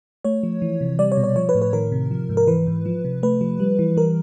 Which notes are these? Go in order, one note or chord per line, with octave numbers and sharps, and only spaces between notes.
A3 C#5
F3
E3
C3
G3 D5
C#5
B2
C#5
F3 C#5
B4
A2
B4
D#3 A#4
C3
F3
G#2
A#4
E3 B4
G#2
F3
C3
A3 B4
F3
G3
E3
G3 A#4